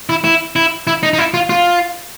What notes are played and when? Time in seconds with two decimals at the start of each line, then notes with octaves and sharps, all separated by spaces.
0.09 E4
0.24 E4
0.56 E4
0.87 E4
1.03 D#4
1.13 D#4
1.18 E4
1.34 F4
1.50 F4